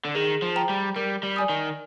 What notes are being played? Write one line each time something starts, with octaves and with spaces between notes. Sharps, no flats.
D3
D#3 G#4
F3
C5 G5 A#5
G3
G3 A#4
G3
D5 G#5 D#6
D#3